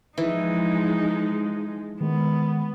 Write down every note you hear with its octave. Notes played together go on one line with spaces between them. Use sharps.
E3 F3 G#3 D#4
D#3 G#3 B3